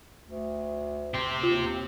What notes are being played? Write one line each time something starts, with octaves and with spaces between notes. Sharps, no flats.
D2
C4 G4
D#2 F4